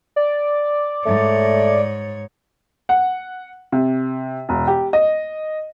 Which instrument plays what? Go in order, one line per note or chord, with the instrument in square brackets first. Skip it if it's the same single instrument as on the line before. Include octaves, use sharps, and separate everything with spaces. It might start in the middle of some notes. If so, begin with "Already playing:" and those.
[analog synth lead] D5
[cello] G#2 C#5 [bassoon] A3
[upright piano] F#5
C3
E1
G4
D#5